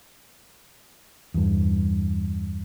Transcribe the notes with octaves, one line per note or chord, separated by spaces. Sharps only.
E2 G2